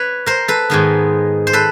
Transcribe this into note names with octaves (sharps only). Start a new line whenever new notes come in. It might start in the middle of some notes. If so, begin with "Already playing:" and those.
Already playing: B4 C#5
A#4 C5
A4 B4
G#2 D#3 G#3 B3
C5
A4 B4